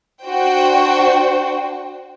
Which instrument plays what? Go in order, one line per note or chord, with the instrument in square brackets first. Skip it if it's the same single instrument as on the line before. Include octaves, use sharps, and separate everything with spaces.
[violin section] D4 F#4 C5 G5